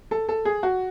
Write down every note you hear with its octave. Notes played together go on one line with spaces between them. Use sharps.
A4
A4
G#4
F#4